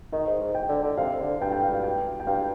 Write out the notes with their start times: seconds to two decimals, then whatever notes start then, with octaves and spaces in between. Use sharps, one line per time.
0.12 D#3 D#5
0.26 G#2
0.41 G#2
0.55 G5
0.69 D3
0.83 D3
0.97 C3 F5
1.20 D3
1.41 G2 G5
1.52 G5
1.63 F5
1.73 F5
1.83 G5
2.20 G5
2.27 G2 F5